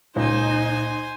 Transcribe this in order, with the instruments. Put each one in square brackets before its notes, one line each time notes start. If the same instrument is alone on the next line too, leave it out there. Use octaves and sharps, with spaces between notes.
[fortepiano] C#2 [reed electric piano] A#2 [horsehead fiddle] D#4 [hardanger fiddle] C5 G#5